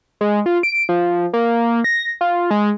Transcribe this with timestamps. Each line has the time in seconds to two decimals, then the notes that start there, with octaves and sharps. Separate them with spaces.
0.21 G#3
0.46 F4
0.63 D7
0.89 F3
1.33 A#3
1.84 A#6
2.21 F4
2.51 G#3